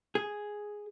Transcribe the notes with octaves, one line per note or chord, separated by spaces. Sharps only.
G#4